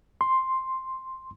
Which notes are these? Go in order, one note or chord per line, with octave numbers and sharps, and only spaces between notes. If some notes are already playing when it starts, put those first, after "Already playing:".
C6